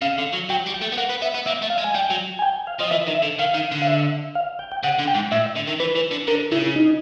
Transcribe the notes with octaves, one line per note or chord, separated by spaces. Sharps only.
C#3 F5
D3
F#3
F#3 G5
G3
G5
A3
B3
A#3 F#5
B3
B3 E5
B3
A#3 E5
A3
F5
G#3
G#5
G3 G5
F#3
G#5
G5
F5
F3 D#5
E3 E5
D#3
E5
D3
D#3 F5
D#3
D3
F5
E5
F5
G5
G5
C#3 F#5
D3
G5
G#2
A2 E5
D3
D#3
E3 B4
E3
D3
D3 A#4
C#3 E4
D#4